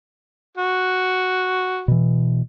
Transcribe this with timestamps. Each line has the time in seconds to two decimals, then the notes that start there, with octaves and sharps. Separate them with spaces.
0.57 F#4
1.88 B2 E3